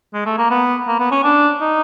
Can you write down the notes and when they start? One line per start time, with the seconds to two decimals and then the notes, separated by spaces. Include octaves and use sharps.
0.14 G#3
0.26 A3
0.38 A#3
0.50 B3
0.87 A#3
1.00 B3
1.12 C#4
1.24 D4
1.61 D#4